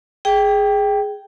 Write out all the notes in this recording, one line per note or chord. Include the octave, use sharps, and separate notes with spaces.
G#4 G5